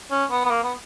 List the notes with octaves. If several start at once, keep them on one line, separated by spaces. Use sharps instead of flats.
C#4
B3
B3
A#3
B3